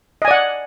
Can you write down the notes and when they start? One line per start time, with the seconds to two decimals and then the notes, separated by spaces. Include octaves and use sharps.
0.22 D#5
0.25 G#5
0.28 D5
0.31 F#5